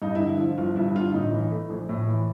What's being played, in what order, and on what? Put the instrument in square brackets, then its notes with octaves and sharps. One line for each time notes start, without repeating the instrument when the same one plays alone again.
[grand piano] G2 [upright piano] D#4
[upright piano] E4
[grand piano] D3
[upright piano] E4
[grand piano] F3
[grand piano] G1 [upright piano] F4
[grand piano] G2 [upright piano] E4
[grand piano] D3 [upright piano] F4
[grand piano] A2 [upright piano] D#4
[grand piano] E3
A3
A#1
A2
E3